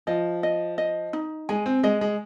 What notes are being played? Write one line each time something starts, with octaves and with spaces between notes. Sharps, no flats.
F3 D#5
D#5
D#5
D#4
G#3 G#5
C4
G#3 D#5
G#3